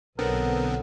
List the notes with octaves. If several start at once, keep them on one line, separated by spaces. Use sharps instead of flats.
B1 D3 B3 C4 A4 A#4 C#5 F#5